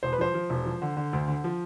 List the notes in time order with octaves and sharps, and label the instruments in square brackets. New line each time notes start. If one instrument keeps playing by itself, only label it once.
[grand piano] E1 C5
B4
F3 C5
F3
E1
F3
D3
D3
D2
D3
F3